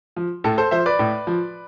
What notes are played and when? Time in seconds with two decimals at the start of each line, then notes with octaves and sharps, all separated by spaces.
0.16 F3
0.44 A2 A4
0.58 A4 C5
0.71 F3 C5 E5
0.86 B4 D5
0.99 A2
1.27 F3